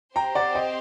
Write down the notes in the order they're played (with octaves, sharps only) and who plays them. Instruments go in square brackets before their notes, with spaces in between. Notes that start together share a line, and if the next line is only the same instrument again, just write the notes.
[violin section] C4 G4 C5 [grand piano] G5 A#5
[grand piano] D5 F#5
D#5 G5